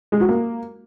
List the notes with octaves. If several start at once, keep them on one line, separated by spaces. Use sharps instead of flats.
G#3
F#4
A#3